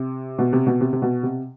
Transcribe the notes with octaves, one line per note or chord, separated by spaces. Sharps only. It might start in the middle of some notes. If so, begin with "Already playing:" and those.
Already playing: C3
B2
C3
B2
C3
C3
B2
C3